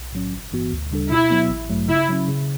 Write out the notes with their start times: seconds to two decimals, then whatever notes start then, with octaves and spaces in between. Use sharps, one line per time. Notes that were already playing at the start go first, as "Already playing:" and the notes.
Already playing: B1
0.12 A2 F#3 C#4
0.33 G1
0.52 G2 E3 B3 F#4
0.72 D2
0.91 C#3 G3 D4 A4
1.11 B2 E4
1.31 F#3 B3
1.49 A1
1.69 G2 F#3 A3
1.89 C#3 E4
2.09 F#3 C#4
2.28 C#3